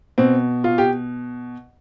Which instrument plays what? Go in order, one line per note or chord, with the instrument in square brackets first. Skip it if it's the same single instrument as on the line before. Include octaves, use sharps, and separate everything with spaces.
[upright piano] B2 C4
F4
G4